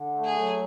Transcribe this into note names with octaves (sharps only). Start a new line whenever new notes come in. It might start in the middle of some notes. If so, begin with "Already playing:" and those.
Already playing: D3
A3
G#4
F#3